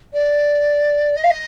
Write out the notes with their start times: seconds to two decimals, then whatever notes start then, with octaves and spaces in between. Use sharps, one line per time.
0.12 D5
1.16 D#5
1.23 F5
1.30 D#5